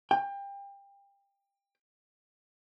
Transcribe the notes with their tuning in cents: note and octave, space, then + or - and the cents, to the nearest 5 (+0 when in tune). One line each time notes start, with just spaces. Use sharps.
G5 +25